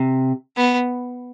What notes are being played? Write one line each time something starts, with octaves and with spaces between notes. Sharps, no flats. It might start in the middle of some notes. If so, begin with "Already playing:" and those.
Already playing: C3
B3